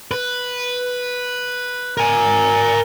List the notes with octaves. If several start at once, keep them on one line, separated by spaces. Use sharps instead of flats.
B4
A#4 G#5